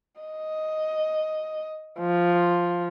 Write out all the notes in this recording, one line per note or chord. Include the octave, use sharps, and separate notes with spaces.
D#5
F3